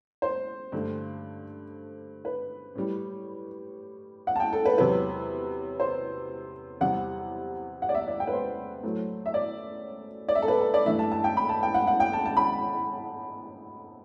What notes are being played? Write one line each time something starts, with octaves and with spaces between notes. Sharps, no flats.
C5
G2 D3 A3
B4
A2 G3
F#5
A5
G5
A4
B4
E2 C3 F#3 B4
C5
E2 C3 G3 F#5
F#5
D5
E5
D5
G5
B4
C5
A2 F#3 A3
E5
D5
D5
E5
A4
B4
A4
D5
G2 E3 A3 E5
A5
A5
G5
B5
A5
G5
F#5
F#5
G5
A5
A5
B5